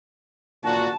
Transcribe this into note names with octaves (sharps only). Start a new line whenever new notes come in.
A#2 F#4 A5